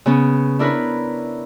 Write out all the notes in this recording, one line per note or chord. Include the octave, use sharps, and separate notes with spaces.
C#3 B3 C#4
D4 E4 A#4 B4 C#5